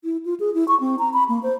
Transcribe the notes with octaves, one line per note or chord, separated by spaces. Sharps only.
E4
F4
G#4
E4
C#6
C4
A#5
B5
A#3
C5